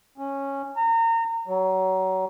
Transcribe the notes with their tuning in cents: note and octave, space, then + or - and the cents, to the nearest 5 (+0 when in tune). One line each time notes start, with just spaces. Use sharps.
C#4 -10
A#5 -30
F#3 +30